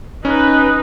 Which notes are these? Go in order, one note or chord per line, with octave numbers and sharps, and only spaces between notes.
C#4 D#4 B4